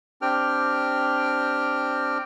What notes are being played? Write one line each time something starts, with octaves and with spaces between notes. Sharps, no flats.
C4 D4 G4 G5 F6